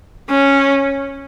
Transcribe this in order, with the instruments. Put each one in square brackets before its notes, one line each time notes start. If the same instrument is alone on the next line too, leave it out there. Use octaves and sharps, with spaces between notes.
[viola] C#4